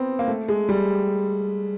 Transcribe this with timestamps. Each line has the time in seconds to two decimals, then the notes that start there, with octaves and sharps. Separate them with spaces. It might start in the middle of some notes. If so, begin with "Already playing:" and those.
Already playing: B3 C4
0.19 A#3
0.28 A3
0.49 G#3
0.69 G3